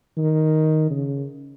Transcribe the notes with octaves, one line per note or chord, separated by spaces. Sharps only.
D#3
C#3